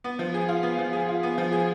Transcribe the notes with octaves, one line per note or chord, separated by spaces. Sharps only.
B3
F3
G#4
F4
B3
F3
G#4
F4
B3
F3
G#4